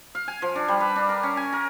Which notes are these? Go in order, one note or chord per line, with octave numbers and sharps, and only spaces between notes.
F5
G#5
F3
D4
G3
B4
D4
A#4
C#4
G#5
A#4